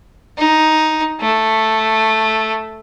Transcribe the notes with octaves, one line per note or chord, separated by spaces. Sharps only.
D#4
A3